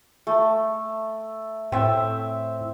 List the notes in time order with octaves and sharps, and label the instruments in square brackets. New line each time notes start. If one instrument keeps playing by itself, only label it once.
[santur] A3
[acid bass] A2 [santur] C4 E5